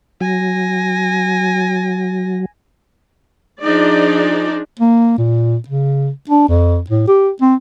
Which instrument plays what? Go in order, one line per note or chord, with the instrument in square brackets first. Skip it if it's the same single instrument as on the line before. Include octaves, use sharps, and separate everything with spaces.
[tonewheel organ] F#3 [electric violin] G#5 A#6
[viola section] F3 D4 D#4 G#4 D5
[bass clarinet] A#3
A#2
C#3
D4
F2
A2
G4
C4